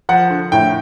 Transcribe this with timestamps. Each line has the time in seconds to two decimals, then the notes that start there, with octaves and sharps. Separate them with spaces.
0.09 F3 F#5
0.30 D3
0.52 A2 G5